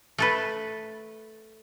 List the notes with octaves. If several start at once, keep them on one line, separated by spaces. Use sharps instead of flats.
A3 A4 B4